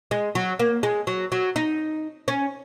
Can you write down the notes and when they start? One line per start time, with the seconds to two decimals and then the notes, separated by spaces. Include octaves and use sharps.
0.11 G#3
0.35 F#3
0.59 A#3
0.83 G#3
1.07 F#3
1.32 F#3
1.56 D#4
2.28 C#4